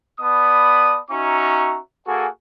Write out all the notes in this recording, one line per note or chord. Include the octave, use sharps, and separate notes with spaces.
B3 D5 A5 B5 D#6
C#4 D#4 F#4 E5 A#5 C#6
A#3 F#4 G#4 A4 G#5